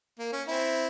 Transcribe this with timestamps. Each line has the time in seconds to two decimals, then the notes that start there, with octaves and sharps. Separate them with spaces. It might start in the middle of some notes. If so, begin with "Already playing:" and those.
0.19 A#3
0.33 C#4
0.48 C4 E4